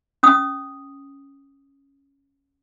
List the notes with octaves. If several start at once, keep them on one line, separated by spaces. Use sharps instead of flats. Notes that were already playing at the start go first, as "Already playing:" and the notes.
C#4 D#6